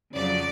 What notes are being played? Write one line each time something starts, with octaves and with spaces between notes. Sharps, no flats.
F2 C#3 F#3 D5